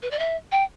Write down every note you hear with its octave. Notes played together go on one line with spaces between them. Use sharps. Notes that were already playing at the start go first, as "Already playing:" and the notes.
B4
D5
E5
G5